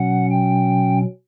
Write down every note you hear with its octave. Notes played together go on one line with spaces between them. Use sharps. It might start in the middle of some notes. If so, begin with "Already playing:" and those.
Already playing: B2 F#3 C#4 F#5
G5